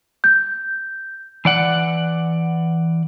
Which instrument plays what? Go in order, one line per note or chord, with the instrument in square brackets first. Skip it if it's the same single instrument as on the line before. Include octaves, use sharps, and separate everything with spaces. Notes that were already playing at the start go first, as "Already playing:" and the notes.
[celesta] G6
[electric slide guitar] E3 D5 F#5